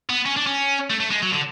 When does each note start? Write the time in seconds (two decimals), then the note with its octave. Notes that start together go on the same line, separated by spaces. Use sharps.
0.09 B3
0.26 C#4
0.37 D4
0.47 C#4
0.90 A3
1.00 A3
1.11 G#3
1.22 F#3
1.32 D3